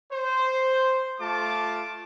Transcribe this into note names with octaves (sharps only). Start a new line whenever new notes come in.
C5
A3 F4 A5 D6